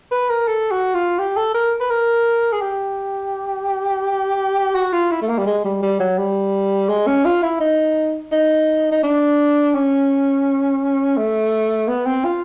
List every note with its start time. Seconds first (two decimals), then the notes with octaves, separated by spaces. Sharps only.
0.11 B4
0.30 A#4
0.48 A4
0.71 F#4
0.95 F4
1.19 G4
1.37 A4
1.54 A#4
1.81 B4
1.90 A#4
2.52 G#4
2.62 G4
4.75 F#4
4.93 F4
5.12 E4
5.22 A3
5.29 A#3
5.38 G3
5.46 G#3
5.65 G3
5.82 G3
6.00 F#3
6.19 G3
6.89 G#3
7.07 C#4
7.25 F4
7.43 E4
7.60 D#4
8.32 D#4
8.92 D#4
9.03 D4
9.75 C#4
11.17 A3
11.88 B3
12.06 C4
12.25 F4